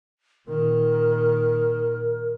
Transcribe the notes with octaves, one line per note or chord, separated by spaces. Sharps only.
A#2 D#3 A#4